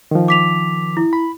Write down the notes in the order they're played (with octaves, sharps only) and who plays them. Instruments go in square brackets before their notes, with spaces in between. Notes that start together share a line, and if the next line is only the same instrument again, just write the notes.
[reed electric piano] D#3 F3
[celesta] D6 B6 F7
E4
[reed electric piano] B5